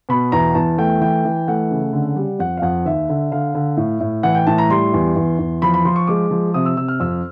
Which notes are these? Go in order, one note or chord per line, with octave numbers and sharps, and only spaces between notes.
B2 B5
E2 A#5
E2 A5
A3 G5
E3 G5
E3
A3 F#5
C#3
D3
G3
F2 F#5
F5
F2 F#5
D#2 E5
D3
D3 F5
D3
A2
A2
E3 F#5
G5
A2 A5
A#5
G3 C6
E2
E2
E2
F3 B5
B5
F3 C6
C#6
G#3 D6
F3
C3 D#6
E6
C3 E6
F6
F2 E6